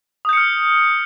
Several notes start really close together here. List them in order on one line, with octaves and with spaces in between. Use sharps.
D#6 G6 C#7 F6